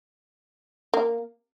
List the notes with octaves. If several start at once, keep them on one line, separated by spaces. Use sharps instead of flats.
A#3